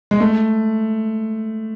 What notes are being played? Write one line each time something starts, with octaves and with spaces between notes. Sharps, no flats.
G#3
A3